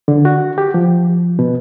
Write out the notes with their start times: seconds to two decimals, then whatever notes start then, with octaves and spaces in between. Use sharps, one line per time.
0.08 D3
0.25 F#4
0.58 G4
0.74 F3
1.39 B2